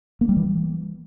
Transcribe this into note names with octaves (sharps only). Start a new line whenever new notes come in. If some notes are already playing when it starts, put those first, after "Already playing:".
A#3
G3
E3